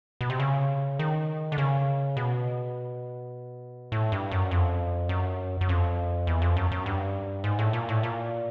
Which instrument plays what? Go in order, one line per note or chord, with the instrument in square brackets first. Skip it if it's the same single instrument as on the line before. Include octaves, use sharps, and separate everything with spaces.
[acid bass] B2
C3
C#3
D#3
D3
C#3
B2
A2
G2
F#2
F2
F#2
F#2
F2
E2
F2
F#2
F#2
G2
G#2
A2
A#2
A2
A#2